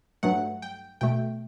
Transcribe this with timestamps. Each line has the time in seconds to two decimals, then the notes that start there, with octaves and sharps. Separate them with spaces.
0.23 G2 F#3 A3 F#5
0.62 G5
1.01 B2 A3 G5